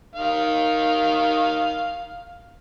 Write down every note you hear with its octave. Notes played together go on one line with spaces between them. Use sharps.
D#3 F5